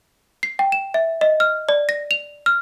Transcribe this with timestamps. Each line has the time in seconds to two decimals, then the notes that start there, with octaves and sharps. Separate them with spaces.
0.43 C7
0.59 G5
0.72 E7
0.94 E5
1.21 D#5
1.40 F6
1.69 D5
1.89 A#6
2.11 F7
2.46 F6